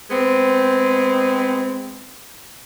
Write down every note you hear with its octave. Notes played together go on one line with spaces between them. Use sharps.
G#3 B3 C4